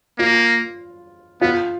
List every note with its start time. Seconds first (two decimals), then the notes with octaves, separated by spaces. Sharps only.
0.18 A#3 F4
1.41 B3 F4